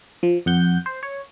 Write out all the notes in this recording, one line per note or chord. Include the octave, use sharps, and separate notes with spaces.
F3
F2 F#5 G6
C5
C#5